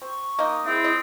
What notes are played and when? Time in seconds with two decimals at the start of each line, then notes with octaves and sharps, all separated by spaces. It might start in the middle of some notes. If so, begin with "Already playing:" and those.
0.02 C4 C#6
0.39 A#3 D#4 D#5
0.66 C4 E4 G#4
0.84 D#5